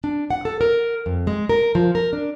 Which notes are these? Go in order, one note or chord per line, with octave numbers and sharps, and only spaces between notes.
D4
F#5
A4
A#4
F2
G#3
A#4
F3
A#4
D4